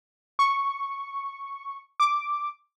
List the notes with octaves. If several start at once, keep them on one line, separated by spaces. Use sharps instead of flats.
C#6
D6